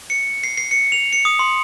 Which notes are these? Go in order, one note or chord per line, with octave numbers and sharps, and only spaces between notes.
C#7
C7
C7
C#7
F7
C#7
D#6
C6